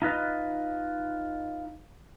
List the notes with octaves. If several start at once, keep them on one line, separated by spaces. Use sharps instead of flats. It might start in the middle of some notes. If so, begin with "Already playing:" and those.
D#4 F4 B4 D#5